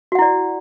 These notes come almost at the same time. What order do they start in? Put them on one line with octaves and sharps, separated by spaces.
F#4 F#5 E4 D5